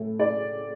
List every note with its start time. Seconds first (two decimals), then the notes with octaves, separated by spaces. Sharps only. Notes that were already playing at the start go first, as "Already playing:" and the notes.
Already playing: A2 A3
0.19 D5